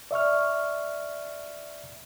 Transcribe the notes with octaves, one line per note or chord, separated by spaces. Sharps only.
D5 E5 C#6 F6